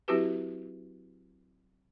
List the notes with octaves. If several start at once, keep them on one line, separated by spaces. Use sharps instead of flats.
F#3 C4 E4 F#4 G4 B4